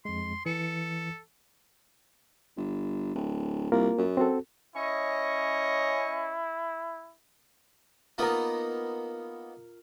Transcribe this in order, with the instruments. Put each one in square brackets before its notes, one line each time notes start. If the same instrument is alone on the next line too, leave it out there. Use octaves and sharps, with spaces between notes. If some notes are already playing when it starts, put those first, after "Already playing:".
[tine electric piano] F2 G#3 [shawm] C6
[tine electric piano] E3 C#7 [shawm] A4
[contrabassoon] G1
D1
[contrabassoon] C2 [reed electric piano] A#3 F4 A#4
[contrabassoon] F#2
[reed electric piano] C4 F#4 A4
[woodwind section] C#4 D#5 C#6 [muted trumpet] E4
[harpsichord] A#3 B3 D#4 [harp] F4 A#4